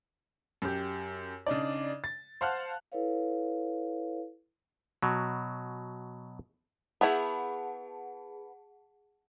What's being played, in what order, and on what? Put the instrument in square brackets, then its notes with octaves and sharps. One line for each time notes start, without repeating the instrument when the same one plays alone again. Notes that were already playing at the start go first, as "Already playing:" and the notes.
[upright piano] F#2 G4
C#3 D4 D#4 D5
A6
C5 F5 F#5 A5 F6 F#6
[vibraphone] E4 A4 B4 C#5 F5
[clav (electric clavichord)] B2 F#3
[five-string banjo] B3 E4 [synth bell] G#4 F#5 A5